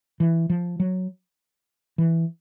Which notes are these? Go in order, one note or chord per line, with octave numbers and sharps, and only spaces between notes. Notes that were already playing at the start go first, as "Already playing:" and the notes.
E3
F3
F#3
E3